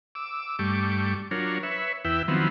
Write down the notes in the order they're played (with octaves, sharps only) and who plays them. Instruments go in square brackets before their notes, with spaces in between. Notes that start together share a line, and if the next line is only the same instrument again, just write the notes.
[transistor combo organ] D6 E6
G2 G3 A3 C#6 D6
F#3 D4 F4 A#4 C#5
B4 C#5 E5
E2 E4 B4 E5 G5
D#3 F3 F#3 B3 C4 E4